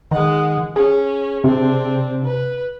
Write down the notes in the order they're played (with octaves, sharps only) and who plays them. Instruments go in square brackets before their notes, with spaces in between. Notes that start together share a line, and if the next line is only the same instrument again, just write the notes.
[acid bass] D#3 [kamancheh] G#3 F#5
[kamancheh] C#4 [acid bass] G#4
[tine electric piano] C3 [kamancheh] C4 D4
[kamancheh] B4